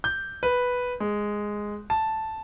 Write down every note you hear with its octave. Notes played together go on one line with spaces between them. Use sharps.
G6
B4
G#3
A5